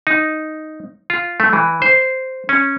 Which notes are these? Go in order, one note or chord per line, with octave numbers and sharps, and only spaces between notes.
D#4
F4
A3
E3
C5
C#4